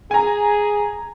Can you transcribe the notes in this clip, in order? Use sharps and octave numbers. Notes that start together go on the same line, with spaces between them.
G#4 G#5 A#5